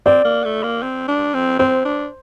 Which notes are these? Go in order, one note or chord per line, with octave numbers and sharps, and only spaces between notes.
C4 D5
A#3
A3
A#3
C4
D4
C4
C4 C5
D4